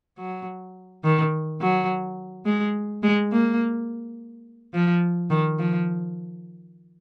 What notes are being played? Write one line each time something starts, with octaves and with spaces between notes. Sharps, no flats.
F#3
D#3
F#3
G#3
G#3
A#3
F3
D#3
F3